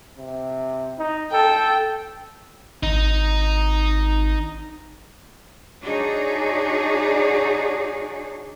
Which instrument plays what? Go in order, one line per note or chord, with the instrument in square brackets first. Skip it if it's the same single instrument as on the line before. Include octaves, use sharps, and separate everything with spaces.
[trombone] C3
D#4
[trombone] A4 [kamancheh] G5
[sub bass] G#1 [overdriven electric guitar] D#4
[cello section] D4 D#4 F#4 G#4 C#5 D5